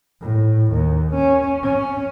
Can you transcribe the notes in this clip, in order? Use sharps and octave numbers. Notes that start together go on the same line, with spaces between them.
A2
D#2
C#4
C#4